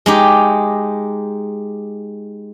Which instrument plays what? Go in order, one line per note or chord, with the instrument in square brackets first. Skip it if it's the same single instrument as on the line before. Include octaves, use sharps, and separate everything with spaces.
[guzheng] G#3 D#4 G4